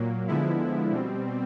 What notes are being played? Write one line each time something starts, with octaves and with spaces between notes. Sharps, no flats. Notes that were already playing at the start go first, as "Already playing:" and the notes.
Already playing: A#2 F#3 A#3
D3 F3 G#3 B3 E4
B2 G3 C4